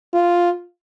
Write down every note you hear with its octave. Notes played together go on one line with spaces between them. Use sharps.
F4